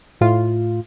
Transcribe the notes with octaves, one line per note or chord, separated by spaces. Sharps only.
A2 F4